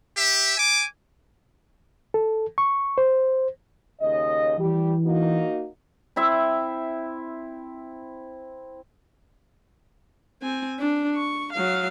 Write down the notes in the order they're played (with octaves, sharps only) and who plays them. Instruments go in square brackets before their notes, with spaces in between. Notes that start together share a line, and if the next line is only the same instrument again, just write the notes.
[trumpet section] G4 E5
G#5 D6
[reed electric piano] A4
C#6
C5
[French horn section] D#2 C#3 D#5
[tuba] E3 [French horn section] G3 G4
[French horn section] A#3 D#4 F#4
[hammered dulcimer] C4 E4 E5
[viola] C4 G#5
D4
C#6
F#3 F5